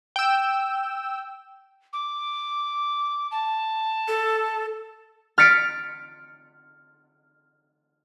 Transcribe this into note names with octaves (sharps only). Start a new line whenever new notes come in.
G5 E6
D6
A5
A4
F6 A6 B6 C#7 D7